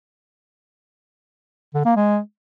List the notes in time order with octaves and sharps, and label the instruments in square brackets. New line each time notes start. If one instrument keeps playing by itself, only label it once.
[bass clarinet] D3
A#3
G#3